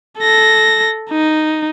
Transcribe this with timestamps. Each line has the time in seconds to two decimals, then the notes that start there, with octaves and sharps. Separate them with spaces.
0.18 A4 A#6
1.10 D#4